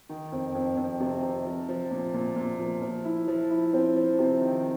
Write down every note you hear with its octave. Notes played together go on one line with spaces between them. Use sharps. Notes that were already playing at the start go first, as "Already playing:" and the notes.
D#3
F2
F2
F2
C3
C3
F3
F3
A#2
A#2
A#2
F3
F3
E4
F3
E4
C4
F3
C3
D#3